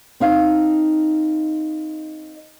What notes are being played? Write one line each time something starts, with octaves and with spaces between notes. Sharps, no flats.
C4 D#4 F5